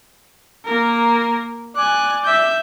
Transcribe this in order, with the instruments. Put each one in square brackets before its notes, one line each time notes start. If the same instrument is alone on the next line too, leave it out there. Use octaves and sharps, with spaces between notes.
[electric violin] A#3 A#4
[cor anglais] D5 [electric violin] G#5 F#6
[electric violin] E5 G6